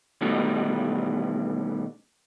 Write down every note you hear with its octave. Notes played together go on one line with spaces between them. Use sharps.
B2 D#3 E3 G3 A3